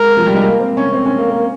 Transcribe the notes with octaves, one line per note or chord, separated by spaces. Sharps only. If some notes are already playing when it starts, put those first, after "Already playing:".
Already playing: G#3 A#4
F3
G3
G#3
A#3
C4
C#4
C4
C#4
A#3
A#3